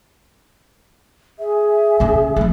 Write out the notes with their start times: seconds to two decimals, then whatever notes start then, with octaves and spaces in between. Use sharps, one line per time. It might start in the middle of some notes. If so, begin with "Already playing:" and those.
1.39 G#4 E5
2.00 D3 C#4
2.36 F3 A3